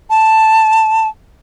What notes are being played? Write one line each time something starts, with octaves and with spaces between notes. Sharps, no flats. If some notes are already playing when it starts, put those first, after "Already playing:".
A5